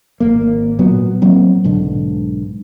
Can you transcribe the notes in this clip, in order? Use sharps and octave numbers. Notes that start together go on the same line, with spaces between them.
G#1 A#3
A#2 F#3 B3
F#3 A#3 C4
B1 G#2 D3